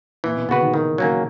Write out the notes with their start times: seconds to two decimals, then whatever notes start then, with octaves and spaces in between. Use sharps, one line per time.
0.24 A#2 E3
0.37 B2
0.49 C#3 B3 F#4 B4
0.61 D#3
0.74 D#3 E3
0.98 F#3 A#3 C#4